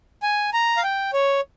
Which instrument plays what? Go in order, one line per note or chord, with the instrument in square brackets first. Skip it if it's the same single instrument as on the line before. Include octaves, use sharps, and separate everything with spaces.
[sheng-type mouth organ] G#5
A#5
F5
G5
C#5